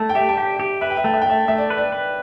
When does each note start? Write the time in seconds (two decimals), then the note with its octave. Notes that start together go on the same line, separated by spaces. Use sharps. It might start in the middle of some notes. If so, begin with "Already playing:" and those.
Already playing: A3 A5
0.09 G5
0.15 G4 E5
0.29 A5
0.37 G4 G5
0.60 G4
0.81 B4 E5
0.90 G5
0.97 E5
1.04 A3 G5
1.14 E5
1.22 G5
1.26 A3 E5
1.48 A3 E5
1.58 D5
1.70 B4
1.78 D5
1.92 B4